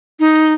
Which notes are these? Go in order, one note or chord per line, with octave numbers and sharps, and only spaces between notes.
D#4